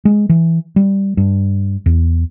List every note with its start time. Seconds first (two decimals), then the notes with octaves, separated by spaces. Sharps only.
0.05 G#3
0.29 E3
0.76 G3
1.17 G2
1.86 E2